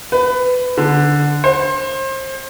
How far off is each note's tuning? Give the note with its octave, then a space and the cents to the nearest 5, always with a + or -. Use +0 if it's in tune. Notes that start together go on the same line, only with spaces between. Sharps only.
B4 +20
D3 -5
C5 +30